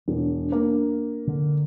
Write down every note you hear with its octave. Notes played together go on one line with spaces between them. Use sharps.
E1 D4
A#3
D3